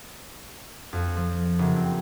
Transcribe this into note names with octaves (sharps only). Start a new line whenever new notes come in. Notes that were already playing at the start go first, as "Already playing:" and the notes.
F2
F3
F#1
C4